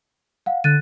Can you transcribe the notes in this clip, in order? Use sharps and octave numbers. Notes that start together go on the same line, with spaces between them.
F5 F#5
D3 F#6 A6 D#7